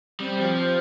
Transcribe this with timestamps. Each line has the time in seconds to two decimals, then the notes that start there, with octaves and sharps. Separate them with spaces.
0.20 G3 C4
0.40 F3